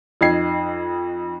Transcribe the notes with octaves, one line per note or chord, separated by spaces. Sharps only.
F2 D#4 G#6 C7